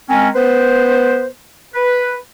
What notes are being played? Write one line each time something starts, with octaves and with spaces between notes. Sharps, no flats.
G#3 C4 C#4 A#4 G#5
B3 B4 C5
B4